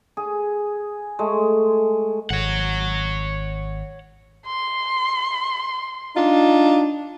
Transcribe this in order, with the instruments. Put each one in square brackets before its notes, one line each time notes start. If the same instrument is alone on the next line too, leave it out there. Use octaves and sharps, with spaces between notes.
[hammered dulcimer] G#4
G#3 A3
[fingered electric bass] G#1 [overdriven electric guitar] C#5 F#5
[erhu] C6
[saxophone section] D4 D#4 F4